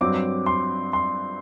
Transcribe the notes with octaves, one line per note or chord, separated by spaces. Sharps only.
G2 F#3 C4 D6
C6
C6